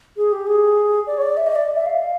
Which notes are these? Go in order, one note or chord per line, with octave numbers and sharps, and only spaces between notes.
G#4
G4
G#4
D5
C#5
D5
E5
D#5
D5
E5
F5